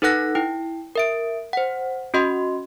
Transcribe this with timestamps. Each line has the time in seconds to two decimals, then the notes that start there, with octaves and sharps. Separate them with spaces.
0.02 D#4 A4 B4 F#5 F#6 A#6
0.35 E4 G5
0.95 A#4 E5 D7
1.53 C5 F#5
2.14 C#4 F#4 D#5 C6